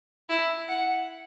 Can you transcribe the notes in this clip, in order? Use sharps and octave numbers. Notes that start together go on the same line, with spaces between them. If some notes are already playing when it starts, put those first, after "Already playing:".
E4
F#5